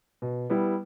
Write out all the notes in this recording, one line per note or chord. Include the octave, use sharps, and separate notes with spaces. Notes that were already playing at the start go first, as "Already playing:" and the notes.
B2
G3 B3 E4